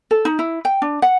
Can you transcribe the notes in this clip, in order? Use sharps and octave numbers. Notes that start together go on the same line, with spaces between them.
A4
D#4
E4
G5
D4
F#5